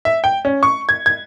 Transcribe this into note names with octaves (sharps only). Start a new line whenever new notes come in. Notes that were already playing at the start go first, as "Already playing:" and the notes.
E5
G5
C#4
C#6
G#6
G#6